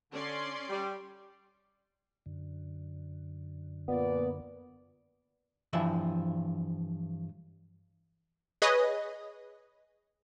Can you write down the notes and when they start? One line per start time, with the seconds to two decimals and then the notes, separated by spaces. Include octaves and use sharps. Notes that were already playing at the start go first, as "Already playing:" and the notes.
0.12 D3 C#4 D5 C6
0.70 G3
2.26 F#2 D3
3.88 A#2 B3 D5
5.73 G2 E3 F3 E5
8.62 G#4 B4 C#5 D#5